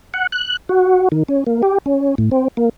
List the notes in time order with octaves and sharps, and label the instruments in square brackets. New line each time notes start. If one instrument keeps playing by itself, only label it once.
[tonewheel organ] F#5
F#6
F#4
D#3
C#4
A#3
G4
C#4
A2
C4
A#3